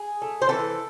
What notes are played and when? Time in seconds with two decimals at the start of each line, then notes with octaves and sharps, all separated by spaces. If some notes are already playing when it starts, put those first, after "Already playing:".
Already playing: G#4
0.22 A3
0.42 C5
0.49 E3 A4